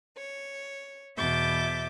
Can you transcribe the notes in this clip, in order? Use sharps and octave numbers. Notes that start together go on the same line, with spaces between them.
C#5
E2 B2 E5 D6 G6 A6